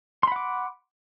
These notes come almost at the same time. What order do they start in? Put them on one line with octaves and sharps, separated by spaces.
C6 B5 F#5 D6